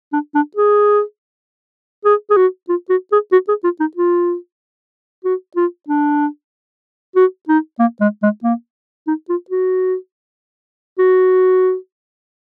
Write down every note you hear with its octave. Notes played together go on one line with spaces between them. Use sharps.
D4
D4
G#4
G#4
G#4
F#4
F4
F#4
G#4
F#4
G#4
F4
D#4
F4
F#4
F4
D4
F#4
D#4
A#3
G#3
G#3
A#3
D#4
F4
F#4
F#4